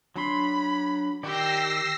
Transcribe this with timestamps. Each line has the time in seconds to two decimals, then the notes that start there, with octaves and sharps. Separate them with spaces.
0.16 F#3 D4 B5 C6
1.23 D#3 G4 D5 G5 E6 A#6 C7